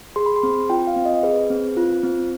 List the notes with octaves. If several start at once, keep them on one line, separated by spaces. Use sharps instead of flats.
G#4 C6
B5
C6
C4
F4 G5
F5
C4
D#5
G#4 B4
C4
F4
C4